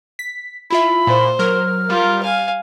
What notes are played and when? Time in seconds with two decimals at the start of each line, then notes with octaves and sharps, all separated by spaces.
0.19 B6
0.70 E4 F4 E5 B5
1.07 A#2 C5
1.39 F#3 A#4 F6
1.90 G3 F4 A#4
2.23 F5 G#5